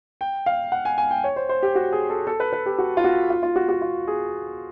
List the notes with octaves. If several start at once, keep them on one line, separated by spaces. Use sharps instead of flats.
G5
F5
F#5
G#5
G#5
G5
C#5
C5
C5
G4
F#4
G#4
A4
A4
B4
B4
G4
F#4
F4
F#4
F4
F4
F#4
F#4
F4
G#4